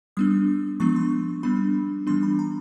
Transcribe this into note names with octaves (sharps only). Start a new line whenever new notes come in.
G3 B3 D4 D#6
F3 G#3 B3 D4 C#6
C6
G3 B3 D4 B5
E3 G3 B3 D4 C6
B5
A#5